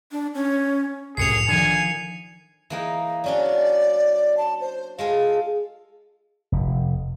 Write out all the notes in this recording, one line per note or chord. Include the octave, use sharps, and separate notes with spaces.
D4
C#4
C2 F#2 A2 G#4 C7 C#7 F7
D3 D#3 F3 F#5 G#5
E3 A#3 D#4
F#3 C#4 D4 D5
A5
C5
G#3 F4 A4 F5
F1